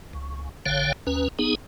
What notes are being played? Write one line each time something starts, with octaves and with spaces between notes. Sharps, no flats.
C#2
A1 D3 C#5 F5 G5
D#2 C#4 B4
B3 D#4 G#4